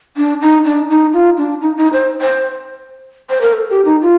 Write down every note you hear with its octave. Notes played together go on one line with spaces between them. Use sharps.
D4
D#4
D4
D#4
F4
D4
D#4
D#4
C5
C5
C5
A#4
A4
G4
D#4
F4